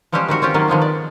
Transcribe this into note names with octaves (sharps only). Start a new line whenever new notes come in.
F3 G3 G#3 C#4 G4 C5
D#3 C4 F#4 A#4
C4 C#4 F4 G4
D#3 F#3 A#3 F4
D#3 F3 G#3 B3
D5